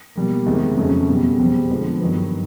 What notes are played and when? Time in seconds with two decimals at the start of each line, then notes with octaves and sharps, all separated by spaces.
0.16 B2 G3 A#3
0.46 E2 C3 D#3 G#3
0.77 F2 C#3 F#3 A3 C#4
1.08 E2 B2 G3
1.39 E2 B2 G3 C4
1.70 D3 F3 G#3 B3
2.01 G2 D#3 F#3 B3